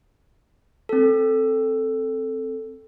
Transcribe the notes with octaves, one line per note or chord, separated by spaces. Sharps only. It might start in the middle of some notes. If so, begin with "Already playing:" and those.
C4 A4